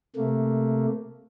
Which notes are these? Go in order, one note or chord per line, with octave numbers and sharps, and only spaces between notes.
C3 A3 A#3